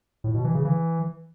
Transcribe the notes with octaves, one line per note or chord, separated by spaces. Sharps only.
A2
B2
E3
C#3
E3